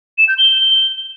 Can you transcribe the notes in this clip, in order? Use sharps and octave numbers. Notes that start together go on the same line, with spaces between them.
E7
G6
G7